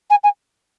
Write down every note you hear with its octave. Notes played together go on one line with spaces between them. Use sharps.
G#5
G#5